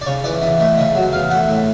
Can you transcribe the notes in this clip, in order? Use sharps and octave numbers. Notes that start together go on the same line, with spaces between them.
D5
C#3 C#5
E3 D5
E2 D#5
A3 D#5
C#3 D#5
F#3
E2 F5
A3 F#5
A2